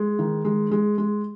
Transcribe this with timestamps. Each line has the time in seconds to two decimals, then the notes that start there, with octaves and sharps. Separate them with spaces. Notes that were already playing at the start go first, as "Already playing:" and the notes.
Already playing: G#3
0.19 D#3
0.45 G#3
0.71 G#3
0.98 G#3